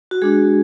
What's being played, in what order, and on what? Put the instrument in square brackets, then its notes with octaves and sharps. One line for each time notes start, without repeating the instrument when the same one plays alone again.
[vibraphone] F#4
G#3 D4 F#4 G#4